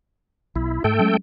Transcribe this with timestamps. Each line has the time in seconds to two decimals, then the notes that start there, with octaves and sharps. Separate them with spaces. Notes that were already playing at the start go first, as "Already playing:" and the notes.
0.56 B1 E4
0.84 G#2 A3 A4 G5
0.99 F#3 G#3 C#4